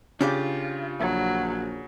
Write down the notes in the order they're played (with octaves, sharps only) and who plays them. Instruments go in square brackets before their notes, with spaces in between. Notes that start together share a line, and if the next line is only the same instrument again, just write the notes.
[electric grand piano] C#3 [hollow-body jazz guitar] D4 G4 D5 [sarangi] F4
[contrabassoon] A#1 [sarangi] F#3